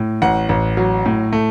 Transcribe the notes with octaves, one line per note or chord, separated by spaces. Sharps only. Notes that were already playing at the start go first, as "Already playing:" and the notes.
Already playing: A2
A1 F#5
A1
F#3
A2
A3